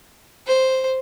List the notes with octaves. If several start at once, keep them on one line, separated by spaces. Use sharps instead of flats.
C5